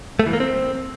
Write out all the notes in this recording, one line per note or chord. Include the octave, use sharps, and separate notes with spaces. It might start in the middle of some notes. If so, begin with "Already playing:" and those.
A3
E3
A#3
C4